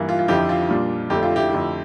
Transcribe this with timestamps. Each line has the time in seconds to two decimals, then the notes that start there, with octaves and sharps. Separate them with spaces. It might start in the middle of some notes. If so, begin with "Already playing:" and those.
Already playing: G2 E3 A#3
0.09 F4
0.19 F4
0.28 F2 D3 F3 E4 G4
0.49 F4
0.69 A#2 G3 D4
1.10 F2 D3 A3 D4 G4
1.23 F4
1.36 E4 G4
1.51 F2 D3 A3